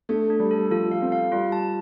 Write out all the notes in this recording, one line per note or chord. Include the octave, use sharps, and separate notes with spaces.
A3 D4
D4
G3
A4
F3 A4
F5
C4
F5
G3 F4
A5